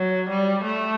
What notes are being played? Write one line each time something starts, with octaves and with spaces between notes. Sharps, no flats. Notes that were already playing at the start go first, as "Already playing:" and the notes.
Already playing: F#3
G3
A3